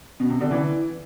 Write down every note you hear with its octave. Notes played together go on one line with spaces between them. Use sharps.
B2
C3
D3
E3